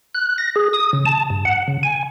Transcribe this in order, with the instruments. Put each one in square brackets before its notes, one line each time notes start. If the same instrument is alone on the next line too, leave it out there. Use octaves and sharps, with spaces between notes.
[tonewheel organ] F#6
A#6
G#4
D#6
C#3
A5
G2
F#5
C#3
G#5